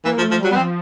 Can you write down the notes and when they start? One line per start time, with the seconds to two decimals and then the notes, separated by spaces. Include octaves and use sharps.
0.04 E3 A#3
0.18 F3
0.22 A3
0.31 F3
0.39 F#3 G3
0.51 B3
0.56 F3 C4